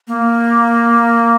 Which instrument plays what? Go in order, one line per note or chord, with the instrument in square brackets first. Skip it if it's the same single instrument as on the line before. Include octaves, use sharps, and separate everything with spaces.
[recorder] A#3